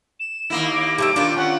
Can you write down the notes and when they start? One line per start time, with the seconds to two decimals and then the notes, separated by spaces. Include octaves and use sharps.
0.20 E7
0.50 D#2 A#3 E4
0.73 D6
0.98 G3 A3 E5
1.16 D#3 D4 F4
1.37 C#4 F#5